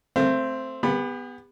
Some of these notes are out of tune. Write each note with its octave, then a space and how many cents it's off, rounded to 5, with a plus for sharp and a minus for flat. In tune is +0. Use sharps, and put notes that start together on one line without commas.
A3 +0 C4 +0 E5 +40
B3 +0 G4 +40 B5 +0